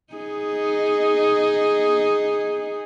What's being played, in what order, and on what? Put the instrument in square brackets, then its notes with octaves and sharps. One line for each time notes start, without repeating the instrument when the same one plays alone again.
[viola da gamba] D#4 G#4